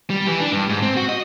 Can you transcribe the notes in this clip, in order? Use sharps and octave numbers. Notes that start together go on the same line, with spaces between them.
G3
E3
D4
G2
G#2
C4
F#4
D#5